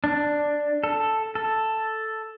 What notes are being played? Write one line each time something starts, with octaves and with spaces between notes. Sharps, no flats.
D4
A4
A4